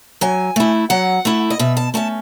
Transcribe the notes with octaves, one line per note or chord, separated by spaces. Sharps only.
F#3 G#5
A3 E4
F#3 F#5
A3 E4
D#5
B2 E5
A5
A3 C#4 A5